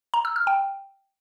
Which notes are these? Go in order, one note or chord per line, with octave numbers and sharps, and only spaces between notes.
A#5
E6
F6
G5